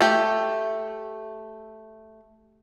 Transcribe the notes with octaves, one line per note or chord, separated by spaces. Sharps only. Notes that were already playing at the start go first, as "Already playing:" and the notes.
A3 G4